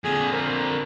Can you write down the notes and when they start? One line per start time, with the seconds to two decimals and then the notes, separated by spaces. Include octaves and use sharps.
0.04 F2 D3 G#4
0.32 A#4 C5